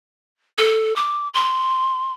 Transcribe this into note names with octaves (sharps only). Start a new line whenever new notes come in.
A4
D6
C6